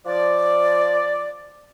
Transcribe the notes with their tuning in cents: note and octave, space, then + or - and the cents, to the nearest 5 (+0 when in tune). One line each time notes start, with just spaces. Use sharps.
F3 +0 D5 +0